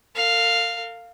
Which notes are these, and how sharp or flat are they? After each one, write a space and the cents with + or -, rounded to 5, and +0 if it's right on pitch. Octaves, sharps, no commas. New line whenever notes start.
A#4 -45 F5 +0